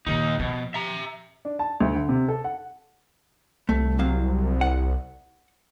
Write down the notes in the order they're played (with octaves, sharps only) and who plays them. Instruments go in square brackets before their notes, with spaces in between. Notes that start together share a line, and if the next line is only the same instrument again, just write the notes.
[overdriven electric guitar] D#2 D#4 [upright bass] A#2 D#3
[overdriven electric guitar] B2 [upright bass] F3
[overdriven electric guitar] E5 A#5
[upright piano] D4
A5
D2
D3
C3
A4
F#5
[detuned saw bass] C2 [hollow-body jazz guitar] A3
[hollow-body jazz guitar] C3 F#3 F5
F#5